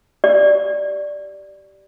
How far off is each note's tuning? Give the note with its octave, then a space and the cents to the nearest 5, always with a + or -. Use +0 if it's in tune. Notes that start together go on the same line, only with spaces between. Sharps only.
G4 -20 D5 +0